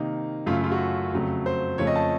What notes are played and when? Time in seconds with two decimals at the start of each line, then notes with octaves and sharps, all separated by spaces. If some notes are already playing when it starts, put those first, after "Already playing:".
Already playing: C3 D#3 A#3 D#4
0.46 F#2 C#3 A3 F4
0.64 F4
0.72 F#4
1.13 F2 C#3 F#3 A3
1.46 C5
1.78 F2 C#3 F3 A3 C#5
1.87 D#5
1.95 A5